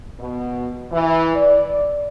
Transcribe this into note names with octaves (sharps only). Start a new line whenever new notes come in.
B2
E3
D5